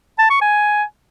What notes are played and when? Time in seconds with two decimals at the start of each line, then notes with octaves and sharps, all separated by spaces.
0.19 A5
0.30 C#6
0.42 G#5